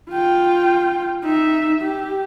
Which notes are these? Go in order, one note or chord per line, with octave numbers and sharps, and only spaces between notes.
F4 G5
D#4 E5
G4